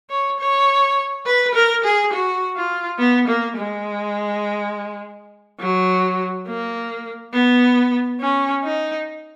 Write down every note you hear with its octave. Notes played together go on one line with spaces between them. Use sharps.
C#5
C#5
B4
A#4
G#4
F#4
F4
B3
A#3
G#3
F#3
A#3
B3
C#4
D#4